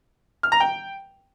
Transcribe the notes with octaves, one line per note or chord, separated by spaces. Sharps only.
F6
A#5
G5